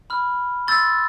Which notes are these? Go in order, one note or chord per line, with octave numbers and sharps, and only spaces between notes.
B5 F6
C6 E6 G6 A6